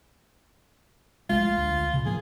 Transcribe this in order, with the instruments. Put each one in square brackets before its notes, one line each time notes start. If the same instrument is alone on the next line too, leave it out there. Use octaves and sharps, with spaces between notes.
[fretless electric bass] A#1 G#3 A3 [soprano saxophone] F4
[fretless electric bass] D2
A#2 C#3
[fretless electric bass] A2 F3 A#3 [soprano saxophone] G#4